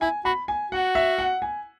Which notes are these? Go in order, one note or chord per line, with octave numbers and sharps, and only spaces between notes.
E4 G#5
F#4 B5
G#5
F#4 F#5
E5
F#5
G#5